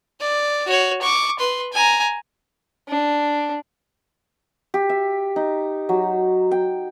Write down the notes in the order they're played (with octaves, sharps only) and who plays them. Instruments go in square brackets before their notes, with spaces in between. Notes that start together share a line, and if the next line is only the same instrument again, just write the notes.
[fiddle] D5
F#4 C#5
C#6 D6
B4 C6
G#5 A#5
D4
[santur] G4
E5
D#4
F#3
G5